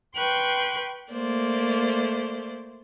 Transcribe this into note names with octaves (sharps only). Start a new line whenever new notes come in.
B4 G5 C6 C#6 F#6
A3 A#3 C5 D5